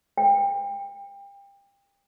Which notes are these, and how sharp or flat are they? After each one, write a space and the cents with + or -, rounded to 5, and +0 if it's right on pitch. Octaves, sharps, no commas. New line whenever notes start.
G5 +30